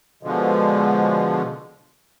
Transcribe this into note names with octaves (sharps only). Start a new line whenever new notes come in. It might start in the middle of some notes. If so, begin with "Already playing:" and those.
B2 D3 F3 G#3